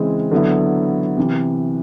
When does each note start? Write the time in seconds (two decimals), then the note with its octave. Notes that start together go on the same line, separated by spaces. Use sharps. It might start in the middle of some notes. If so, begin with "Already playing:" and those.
Already playing: C#3 E3 G#3 C4
0.31 D3 F#3 B3 E4
1.17 C3 E3